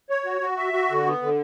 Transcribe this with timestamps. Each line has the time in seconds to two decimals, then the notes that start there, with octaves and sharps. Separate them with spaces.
0.10 C#5
0.26 F#4
0.41 F#4
0.57 E5
0.73 F#4
0.90 D3
1.06 B3
1.22 D3